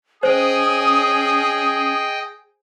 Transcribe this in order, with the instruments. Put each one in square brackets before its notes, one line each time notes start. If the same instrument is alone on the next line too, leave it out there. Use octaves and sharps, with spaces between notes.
[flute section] C#4 D#6 [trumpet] G#4 [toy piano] C5 [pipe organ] D#5 G5